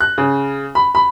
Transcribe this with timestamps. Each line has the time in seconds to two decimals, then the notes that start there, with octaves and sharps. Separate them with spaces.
0.01 F#6
0.18 C#3
0.75 B5
0.95 B5